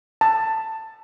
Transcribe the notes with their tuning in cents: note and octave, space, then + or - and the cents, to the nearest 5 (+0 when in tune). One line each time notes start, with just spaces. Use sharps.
A5 +15